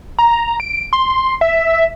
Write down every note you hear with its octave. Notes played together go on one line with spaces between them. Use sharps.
A#5
D7
C6
E5